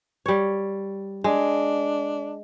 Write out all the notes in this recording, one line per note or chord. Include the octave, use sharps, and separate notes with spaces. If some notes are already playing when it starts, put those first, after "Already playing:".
G3 C#5
G#3 D4